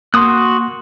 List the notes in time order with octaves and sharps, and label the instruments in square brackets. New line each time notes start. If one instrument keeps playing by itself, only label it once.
[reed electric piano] A#3 C6 [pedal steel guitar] F#4 D#6 F#6